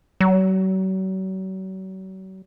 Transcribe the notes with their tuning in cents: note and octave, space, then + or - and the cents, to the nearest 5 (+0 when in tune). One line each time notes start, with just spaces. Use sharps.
F#3 +40